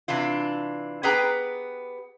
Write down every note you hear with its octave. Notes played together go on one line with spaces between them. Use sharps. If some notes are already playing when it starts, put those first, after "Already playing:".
C3 E3 D4 F4
B3 G4 G#4 B4 G5 A#5